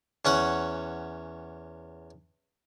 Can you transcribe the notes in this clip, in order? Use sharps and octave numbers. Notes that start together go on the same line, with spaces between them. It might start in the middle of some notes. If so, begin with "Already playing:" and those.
E2 C#4 C#5 F#5